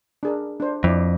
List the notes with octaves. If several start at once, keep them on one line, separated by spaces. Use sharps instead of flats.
D4 G#4 A#4
D4 C5
F2 E4 D5